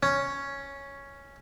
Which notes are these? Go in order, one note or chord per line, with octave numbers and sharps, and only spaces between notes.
C#4